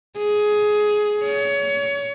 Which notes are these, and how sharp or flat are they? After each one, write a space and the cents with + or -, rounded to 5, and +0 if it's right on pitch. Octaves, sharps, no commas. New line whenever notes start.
G#4 +15
C#5 +25